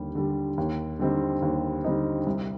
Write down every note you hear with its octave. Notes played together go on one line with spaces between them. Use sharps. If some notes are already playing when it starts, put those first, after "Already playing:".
Already playing: D#2 D3 G3
D3 G3
D#2
D3 G3 C4 D#4
D#2
D3 G3 C4 D#4
C2